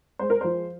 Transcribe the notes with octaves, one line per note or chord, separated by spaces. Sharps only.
G#3 C5
A#4
F3 C5